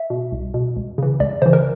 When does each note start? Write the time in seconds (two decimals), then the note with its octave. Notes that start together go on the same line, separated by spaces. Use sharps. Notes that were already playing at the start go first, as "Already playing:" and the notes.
Already playing: E5
0.10 B2
0.32 C2
0.54 B2
0.76 C#2
0.98 C#3 E3
1.20 C#2 D5
1.42 C#3 E3 C5
1.53 A#4